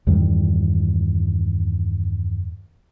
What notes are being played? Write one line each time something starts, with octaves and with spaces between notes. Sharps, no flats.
E2 G2 D#3 G3